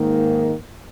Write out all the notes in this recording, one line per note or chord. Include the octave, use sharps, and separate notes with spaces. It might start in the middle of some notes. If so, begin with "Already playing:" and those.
Already playing: G#2 D#3 A#3